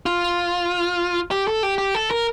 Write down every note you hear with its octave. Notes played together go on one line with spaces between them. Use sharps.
F4
G4
A4
G4
G4
A4
A#4